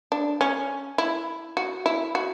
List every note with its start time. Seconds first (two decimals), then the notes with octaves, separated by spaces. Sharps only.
0.12 D4
0.41 C#4
0.98 E4
1.57 F#4
1.86 E4
2.15 F#4